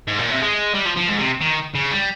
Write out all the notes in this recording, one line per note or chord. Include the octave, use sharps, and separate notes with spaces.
G#2
A#2
C3
G#3
G3
F3
F3
G#2
C3
D#3
C#3
G3